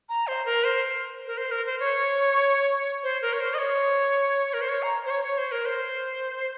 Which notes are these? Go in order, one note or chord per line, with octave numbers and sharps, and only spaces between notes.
A#5
C5
A#4
C5
A#4
C5
A#4
C5
C#5
C5
A#4
C#5
C5
D#5
C#5
A#4
C5
C#5
A#5
C5
C#5
C#5
C5
A#4
C5